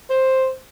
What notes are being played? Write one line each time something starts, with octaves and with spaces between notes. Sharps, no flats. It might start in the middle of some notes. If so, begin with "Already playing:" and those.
C5